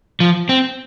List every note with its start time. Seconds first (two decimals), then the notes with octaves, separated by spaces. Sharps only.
0.20 F3
0.49 C4